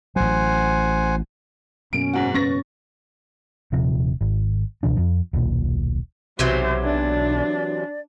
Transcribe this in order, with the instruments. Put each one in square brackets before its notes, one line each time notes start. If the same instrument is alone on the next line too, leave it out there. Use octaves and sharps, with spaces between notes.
[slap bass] A1 F#3 [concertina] C5 F#5 G#5
[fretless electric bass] F#2 B2 A#3 [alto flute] C#4 [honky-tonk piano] D7
[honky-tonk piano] G#2 F#4
[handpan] C#4 [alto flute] B4 [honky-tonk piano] C#6 A6 A#6
[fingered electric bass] D#1 C3 F3
G#1
C#2 B2 E3 D4
F2 F3
D#1 B1 A#2
[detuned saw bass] B1 [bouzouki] C3 E3 F#3 [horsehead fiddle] F#4 C5
[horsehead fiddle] D4 [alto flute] D5